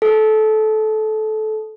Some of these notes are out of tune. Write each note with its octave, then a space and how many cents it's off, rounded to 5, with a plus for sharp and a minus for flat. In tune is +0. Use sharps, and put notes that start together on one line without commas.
A4 -20